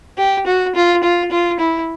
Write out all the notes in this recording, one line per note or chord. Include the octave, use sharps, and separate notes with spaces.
G4
F#4
F4
F4
F4
E4